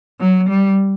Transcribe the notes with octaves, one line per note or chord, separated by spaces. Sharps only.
F#3
G3